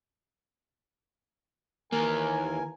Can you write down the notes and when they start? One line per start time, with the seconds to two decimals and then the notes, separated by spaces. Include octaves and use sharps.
1.92 D#2 E3 A#3 A#4 G#5